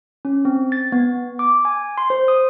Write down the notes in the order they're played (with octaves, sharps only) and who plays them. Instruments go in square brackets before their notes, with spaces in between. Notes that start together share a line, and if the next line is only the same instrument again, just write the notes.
[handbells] C#4
C4
A6
B3
D6
G#5
C6
C5
D#6